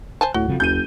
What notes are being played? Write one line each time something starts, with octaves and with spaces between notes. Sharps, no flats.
C5 G#5 A5
D1 A2 F#4
F2 C#3 F3 G3
F#1 D#2 G6 D#7